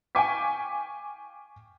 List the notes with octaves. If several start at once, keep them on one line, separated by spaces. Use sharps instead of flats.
F5 G5 G#5 C#6 D6 B6